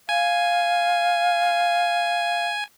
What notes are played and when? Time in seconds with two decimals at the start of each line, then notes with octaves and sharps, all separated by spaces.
0.09 F5 G#5